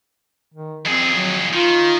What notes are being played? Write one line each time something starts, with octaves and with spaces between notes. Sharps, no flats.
D#3
F2 C4 G#4
F#3
D#3 F4